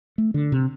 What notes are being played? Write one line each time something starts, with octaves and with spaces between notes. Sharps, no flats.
A3
D3
C3